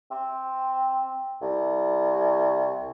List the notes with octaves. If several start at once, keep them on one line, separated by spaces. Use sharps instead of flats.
C4
C2